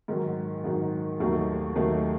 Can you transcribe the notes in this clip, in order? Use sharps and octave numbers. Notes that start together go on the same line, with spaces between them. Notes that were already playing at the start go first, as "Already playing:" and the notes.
G#2 D#3 F#3
G#2 D#3 F#3
D#2 D#3 F#3 A3
D#2 D#3 F#3 A3